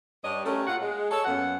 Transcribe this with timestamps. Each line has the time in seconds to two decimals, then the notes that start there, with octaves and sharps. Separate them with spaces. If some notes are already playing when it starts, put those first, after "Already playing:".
0.24 G2 G3 D4 C#5 D#5
0.45 A3 C#4 G4 A4 A#4
0.67 A#2 F4 F#5
0.81 G#3
1.11 A4 C#5
1.25 F#2 A#3 B3 F#5